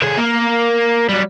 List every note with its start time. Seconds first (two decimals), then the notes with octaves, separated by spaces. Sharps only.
0.02 D3 G#4
0.17 A#3
1.09 F#3 G3